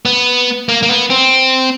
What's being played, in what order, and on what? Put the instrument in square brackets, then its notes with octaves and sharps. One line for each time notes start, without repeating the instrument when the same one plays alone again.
[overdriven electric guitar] B3
A#3
A#3
B3
C4